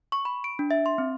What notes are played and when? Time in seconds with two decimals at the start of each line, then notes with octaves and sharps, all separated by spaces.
0.12 C#6
0.25 B5
0.44 D7
0.59 D4
0.71 E5
0.86 C6
0.98 C4